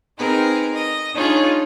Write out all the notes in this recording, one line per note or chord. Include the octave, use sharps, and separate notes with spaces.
C4 D#4 G#4 A#4 B4
D#5
D4 D#4 F4 G#4 C#5